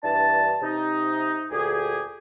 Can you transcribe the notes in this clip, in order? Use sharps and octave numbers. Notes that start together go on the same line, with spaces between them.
G2 E3 D4 A5
C3 D#4
D2 A#2 D3 G4 G#4